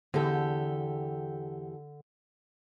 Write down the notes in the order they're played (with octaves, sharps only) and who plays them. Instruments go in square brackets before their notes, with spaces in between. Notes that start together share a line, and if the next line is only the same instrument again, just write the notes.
[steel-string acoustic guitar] E2 G4 A4 [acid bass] D3